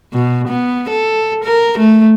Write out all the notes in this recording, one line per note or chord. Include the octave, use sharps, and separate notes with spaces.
B2
B3
A4
A#4
A3